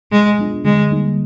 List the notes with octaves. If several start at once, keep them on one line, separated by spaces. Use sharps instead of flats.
B2 G#3
F#3 B3 D4 F4
D3 G#3
G3 A#3 D#4